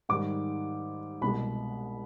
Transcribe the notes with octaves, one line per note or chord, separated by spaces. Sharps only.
G#2 D#3 G3 D6
C2 B2 G#3 B5